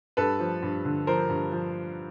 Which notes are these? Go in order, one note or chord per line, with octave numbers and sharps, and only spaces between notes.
G2 A4 B4
F3
G2
D3
F3 A#4 C5
G2
F3